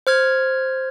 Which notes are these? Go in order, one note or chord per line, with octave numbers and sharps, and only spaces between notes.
C5 F6 G#6